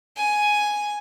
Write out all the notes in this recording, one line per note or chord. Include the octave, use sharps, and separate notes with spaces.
G#5